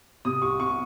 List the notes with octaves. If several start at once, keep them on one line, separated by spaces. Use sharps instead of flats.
C3 D#6
C2 C#6
C2 C#6